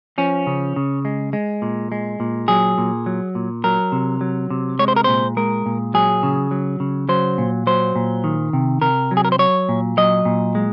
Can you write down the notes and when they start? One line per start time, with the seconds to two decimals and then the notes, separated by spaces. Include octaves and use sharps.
0.18 F3 C#4
0.47 C#3
0.76 C#3
1.05 G#3
1.33 G#3
1.62 A#2
1.92 G#3
2.20 A#2
2.48 F#3 G#4
2.78 A#2
3.06 F#3
3.35 A#2
3.64 F#3 A#4
3.92 C3
4.21 F#3
4.50 C3
4.79 G#3 C#5
4.88 C5
4.96 A#4
5.04 A#2 C5
5.37 G#3 A#4
5.66 A#2
5.94 F#3 G#4
6.23 C#3
6.51 F#3
6.80 C#3
7.09 F#3 C5
7.38 A#2
7.67 F#3 C5
7.96 A#2
8.24 D#3
8.53 C3
8.82 C3 A#4
9.11 F#3
9.17 G#4
9.25 A#4
9.32 C5
9.39 F#3 C#5
9.69 A#2
9.98 F#3 D#5
10.25 A#2
10.55 G#3